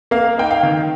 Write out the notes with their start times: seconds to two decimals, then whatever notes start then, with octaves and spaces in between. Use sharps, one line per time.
0.11 A#3 F5
0.38 D#4 G5
0.51 F5
0.63 D#3